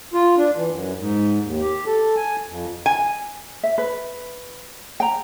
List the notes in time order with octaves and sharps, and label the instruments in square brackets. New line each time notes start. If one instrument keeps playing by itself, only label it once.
[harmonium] F4
D4
E3
F#2
G#2
D#2
G4
A4
G#5
F2
[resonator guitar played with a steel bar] G#5
[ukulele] E5
B4
G5 A#5